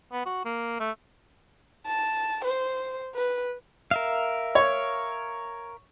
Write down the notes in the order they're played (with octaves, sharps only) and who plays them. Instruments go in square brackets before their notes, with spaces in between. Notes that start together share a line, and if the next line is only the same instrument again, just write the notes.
[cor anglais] B3
F#4
A#3
A3
[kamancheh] A5
C5
B4
[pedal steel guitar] A#4 E5 F5
[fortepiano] C#5